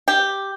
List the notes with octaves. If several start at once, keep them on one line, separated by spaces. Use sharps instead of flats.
G4